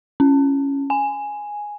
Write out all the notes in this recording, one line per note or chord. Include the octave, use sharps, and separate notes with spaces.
C#4
G#5